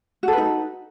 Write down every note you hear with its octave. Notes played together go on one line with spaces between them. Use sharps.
D#4 F#4 A4 B4